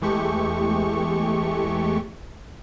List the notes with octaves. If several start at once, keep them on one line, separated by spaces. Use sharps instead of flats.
E2 E3 G#3 A3 G4 C#6